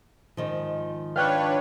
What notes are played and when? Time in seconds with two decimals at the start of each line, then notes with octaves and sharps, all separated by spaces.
0.37 G#2 D#3 F3
1.16 D4 B4 C#5 F5 G5 F#6